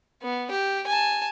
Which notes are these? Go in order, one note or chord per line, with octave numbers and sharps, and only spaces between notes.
B3
G4
G#5 A5